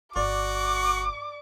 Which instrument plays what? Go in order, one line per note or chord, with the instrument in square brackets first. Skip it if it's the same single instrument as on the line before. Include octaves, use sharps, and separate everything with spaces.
[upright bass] G1 [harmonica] F#4 [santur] D5 [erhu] D6